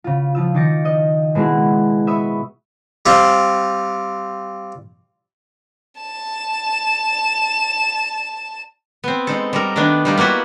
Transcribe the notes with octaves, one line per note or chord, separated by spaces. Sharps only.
C#3 F4
F3 F4 E6
D#3 D#4 D6 A6 A#6 C#7
D#5
B2 G#3 A#3 E4 F#4 G#4
E5 B5 C#6 D#6 E6
G3 C4 F4
A5 E7
B3 C4
G#3 D#4 A4
G3 A4 A#4
D#3 A3 B3 D4
G3 D#4 F4
A#3 B3 E4 F#4 G4